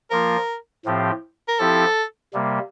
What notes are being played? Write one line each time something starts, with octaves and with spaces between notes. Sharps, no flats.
F3 A#3 F4 A#4
A2 F3 C4 G4
A#4
F3 C4 E4 G4 A4
C3 G3 A#3